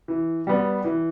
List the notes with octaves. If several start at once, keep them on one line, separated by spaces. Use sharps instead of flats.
E3
G3 B3
E3